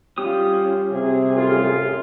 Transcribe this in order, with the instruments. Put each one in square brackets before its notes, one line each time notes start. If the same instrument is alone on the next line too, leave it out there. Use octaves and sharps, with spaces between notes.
[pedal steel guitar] G3 G4 D#6 [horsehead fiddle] C#4 F4
[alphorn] C3 [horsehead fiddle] G#4
[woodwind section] F#2 A2 F4